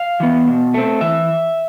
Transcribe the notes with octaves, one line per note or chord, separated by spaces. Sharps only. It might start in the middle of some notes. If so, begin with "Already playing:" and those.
Already playing: F5
E3 B3
B2
A3 C4
E3 E5